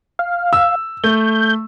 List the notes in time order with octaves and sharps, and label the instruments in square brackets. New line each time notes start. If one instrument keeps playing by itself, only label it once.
[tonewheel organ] F5
[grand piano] E6
[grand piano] A3 [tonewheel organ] G6